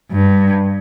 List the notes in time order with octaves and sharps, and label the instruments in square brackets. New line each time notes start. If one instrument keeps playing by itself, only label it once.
[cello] G2